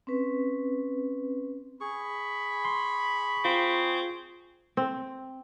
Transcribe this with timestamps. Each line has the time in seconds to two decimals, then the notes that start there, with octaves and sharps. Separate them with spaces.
0.07 C4 C#4 B4
1.81 G#4 B5 C#6
2.65 C6
3.45 C4 F4
4.77 C4